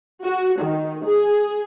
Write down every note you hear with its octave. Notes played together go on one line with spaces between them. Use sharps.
F#4
D#3
G#4